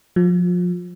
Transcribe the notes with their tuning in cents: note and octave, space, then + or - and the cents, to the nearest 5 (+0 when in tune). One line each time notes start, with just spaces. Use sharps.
F3 +30